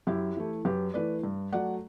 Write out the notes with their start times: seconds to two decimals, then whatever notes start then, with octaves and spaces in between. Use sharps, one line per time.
0.07 F#2 E4 G4
0.37 E3 A3
0.65 F#2 G4 B4
0.94 E3 A3 B4 D5
1.23 G2
1.52 F#3 A3 D5 F#5